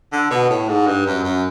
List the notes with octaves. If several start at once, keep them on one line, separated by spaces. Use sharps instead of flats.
D3
B2
A2
G#2
G2
F#2
F#2